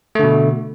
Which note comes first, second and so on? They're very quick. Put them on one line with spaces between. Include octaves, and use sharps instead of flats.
A3 D3 B2